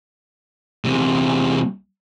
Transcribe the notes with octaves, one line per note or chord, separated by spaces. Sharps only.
E2 C3